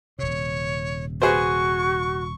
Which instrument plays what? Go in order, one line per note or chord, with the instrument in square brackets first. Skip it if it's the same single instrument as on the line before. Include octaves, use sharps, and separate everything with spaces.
[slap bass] D#1 C3 [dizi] C#5
[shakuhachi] F#4 [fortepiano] G#4 B4 C5 [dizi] C#6